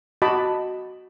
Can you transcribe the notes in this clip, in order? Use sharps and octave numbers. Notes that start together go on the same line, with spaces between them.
F#4 D#5 A5 B5 D6